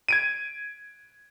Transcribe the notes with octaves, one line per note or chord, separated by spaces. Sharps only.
G#6 D7 D#7